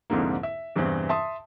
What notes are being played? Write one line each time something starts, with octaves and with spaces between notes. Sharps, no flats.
C2 F2 G#2 D3 A#3
E5
E2 G2 C3 E3 C4
E5 A5 C6 D#6